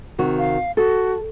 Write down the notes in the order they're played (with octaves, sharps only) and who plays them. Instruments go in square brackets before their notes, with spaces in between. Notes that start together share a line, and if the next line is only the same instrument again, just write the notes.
[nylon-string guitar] C3 D#3 F#4
[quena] F5
[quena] F#4 [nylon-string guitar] A4